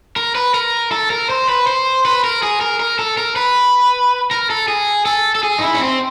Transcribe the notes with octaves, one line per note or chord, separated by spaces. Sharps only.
A#4
B4
A#4
A4
A#4
C5
B4
C5
B4
A#4
G#4
A#4
A#4
A4
A#4
B4
A#4
A4
G#4
A4
A4
G#4
D#4
E4
C#4
C4